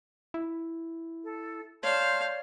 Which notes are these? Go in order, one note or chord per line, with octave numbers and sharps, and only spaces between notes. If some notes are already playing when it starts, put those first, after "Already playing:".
E4
A4
C#5 D5 F5 A5 C6 G6